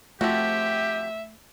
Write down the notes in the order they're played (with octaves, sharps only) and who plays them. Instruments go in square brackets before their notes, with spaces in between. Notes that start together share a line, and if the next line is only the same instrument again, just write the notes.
[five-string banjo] F3 C4 F#4 [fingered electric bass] A3 [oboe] G4 [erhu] E5